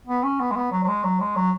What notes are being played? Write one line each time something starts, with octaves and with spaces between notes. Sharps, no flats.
B3
C#4
B3
G#3
B3
F#3
F#3
G#3
F#3
G#3
F#3